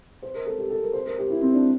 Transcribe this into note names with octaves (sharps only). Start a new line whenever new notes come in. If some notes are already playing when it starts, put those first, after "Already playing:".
C5
A#4
A4
G4
A4
A#4
C5
A#4
G4
E4
C4
D4